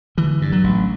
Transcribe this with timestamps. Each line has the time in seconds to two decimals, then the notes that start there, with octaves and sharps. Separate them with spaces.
0.17 D3 E3
0.42 G2
0.52 F#3
0.64 A1